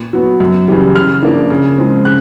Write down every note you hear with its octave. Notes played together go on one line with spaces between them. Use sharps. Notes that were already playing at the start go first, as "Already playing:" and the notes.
Already playing: A#2
F#3 B3
F#2
C#3 E3 G3
C#3 F6
F3 A#3 D4
C#3
F3 G#3 C4
C#3 F#6